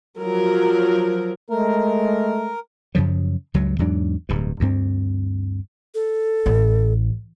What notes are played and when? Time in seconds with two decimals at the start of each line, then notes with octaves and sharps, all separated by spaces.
0.18 F3 F#3 A#4
1.50 G#3 A3 A#4
2.95 F#2 C#3 F3 F#3
3.54 C#2 G2 F#3
3.79 E2 G#2 F#3 D4
4.29 D1 G2
4.60 D2 G2 C4
5.95 A4
6.46 A1